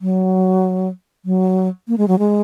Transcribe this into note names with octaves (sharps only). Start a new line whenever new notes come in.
F#3
F#3
A#3
G#3
F#3
G#3